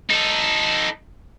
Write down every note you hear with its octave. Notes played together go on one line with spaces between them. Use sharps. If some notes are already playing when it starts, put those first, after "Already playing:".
D#4 A4